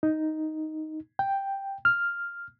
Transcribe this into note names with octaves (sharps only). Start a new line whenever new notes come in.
D#4
G5
F6